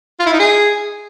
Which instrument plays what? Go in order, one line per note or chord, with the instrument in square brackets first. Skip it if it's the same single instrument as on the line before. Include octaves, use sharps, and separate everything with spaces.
[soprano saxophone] F4
E4
D#4
G#4